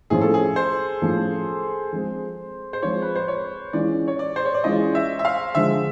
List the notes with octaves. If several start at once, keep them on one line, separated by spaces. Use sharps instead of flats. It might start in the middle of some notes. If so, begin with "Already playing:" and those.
A2 F3 A3 C#4 F4 G#4
A4
G#4
C5
A2 F3 A3 C#4 F4
F3 G#3 C4 F4
C5
F3 G#3 C4 F4 C#5
B4
C5
C#5
E3 G#3 C#4 F4 D5
C#5
D5
C5
C#5
D5
E3 G#3 C#4 F4 D#5
E5
E5
F5
D3 F3 G#3 E5